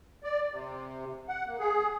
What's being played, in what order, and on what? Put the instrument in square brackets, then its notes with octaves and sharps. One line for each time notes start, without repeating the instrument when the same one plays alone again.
[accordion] D5
C3
F#5
A#3
G#4